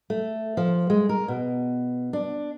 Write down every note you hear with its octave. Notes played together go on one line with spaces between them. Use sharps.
A3
F3
G#3
A#4
B2
D4